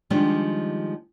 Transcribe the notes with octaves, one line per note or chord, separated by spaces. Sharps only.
D#3 F3 G3 G#3 D4